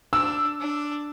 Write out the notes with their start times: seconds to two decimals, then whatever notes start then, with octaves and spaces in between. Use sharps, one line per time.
0.13 D4 E6
0.60 D4